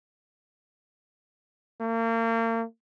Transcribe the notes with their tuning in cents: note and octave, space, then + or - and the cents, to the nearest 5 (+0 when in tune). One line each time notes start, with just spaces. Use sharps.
A#3 -35